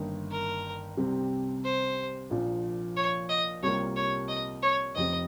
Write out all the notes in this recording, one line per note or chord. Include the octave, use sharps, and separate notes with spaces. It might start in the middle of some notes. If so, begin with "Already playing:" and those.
Already playing: G1 G2 D#3 A#3 D#4
A#4
C2 C3 G3 C4
C5
A#1 A#2 F3
C#5
D#5
C2 C3 G3 A#3 F4 C#5
C#5
D#5
C#5
F1 F2 C3 D#5